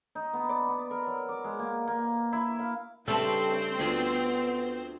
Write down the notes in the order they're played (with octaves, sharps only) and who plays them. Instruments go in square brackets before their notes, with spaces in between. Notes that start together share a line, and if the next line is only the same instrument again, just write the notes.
[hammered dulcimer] D#4
B3
D5
B3
A#4
F#3
D6
G#3
A#3
A#3
E4
F5
[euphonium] G2 [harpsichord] C#3 A3 B4 [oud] G3 A4 [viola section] C4
[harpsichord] D2 F3 G#4 [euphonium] B3